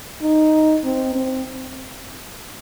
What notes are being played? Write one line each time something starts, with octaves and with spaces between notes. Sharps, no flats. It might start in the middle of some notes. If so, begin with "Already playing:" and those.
D#4
C4
C4